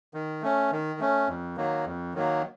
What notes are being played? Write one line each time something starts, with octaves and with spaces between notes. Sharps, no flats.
D#3
A3 C#4
D#3
A3 C#4
F2
D#3 F#3 A#3
F2
D#3 F#3 A#3